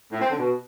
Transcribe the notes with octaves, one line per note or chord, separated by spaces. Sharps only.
A2
C4
D3
B2